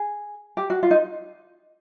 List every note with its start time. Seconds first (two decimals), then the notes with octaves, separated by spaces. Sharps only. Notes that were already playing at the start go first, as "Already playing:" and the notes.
Already playing: G#4
0.57 G4
0.70 F#4
0.83 F4
0.91 D#4